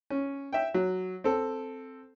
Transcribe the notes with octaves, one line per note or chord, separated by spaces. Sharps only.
C#4
E5 G5
F#3
C4 A4